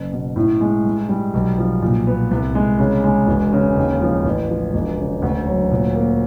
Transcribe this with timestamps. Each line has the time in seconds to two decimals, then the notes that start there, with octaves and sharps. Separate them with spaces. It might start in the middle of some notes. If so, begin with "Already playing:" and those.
Already playing: F#1
0.12 B2
0.36 A2
0.61 G#3
0.85 G2
1.09 G3
1.34 B1
1.58 F3
1.82 A#2
2.07 B3
2.31 C2
2.55 G#3
2.79 C#3
3.04 G#3
3.27 E1
3.52 C#3
3.77 D#2
4.01 F3
4.25 A1
4.49 F3
4.74 E1
4.99 C#3
5.22 D2
5.47 F#3
5.71 A#2
5.95 A#3